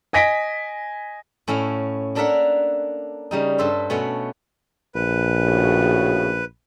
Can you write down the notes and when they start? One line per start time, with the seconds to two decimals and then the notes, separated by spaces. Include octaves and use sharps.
0.13 D#5 G#5 A#6 B6 D7
1.48 A2 C#4 E4 F5
2.15 A#3 D4 A4 A#4 E5 F#5
3.31 C#3 G3 D#4
3.58 G2 A4 C5 E5 C6
3.90 B2 A3 C#4 F#5
4.95 A#1 B4
5.43 A2 C#3 F#4